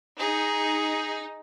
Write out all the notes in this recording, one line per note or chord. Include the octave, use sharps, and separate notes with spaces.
D#4 G#4